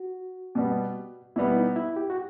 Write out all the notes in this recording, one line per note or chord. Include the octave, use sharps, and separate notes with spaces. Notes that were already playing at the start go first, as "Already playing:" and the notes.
Already playing: F#4
B2 G3 B3
B2 G3 B3 E4
D#4
E4
G4
F#4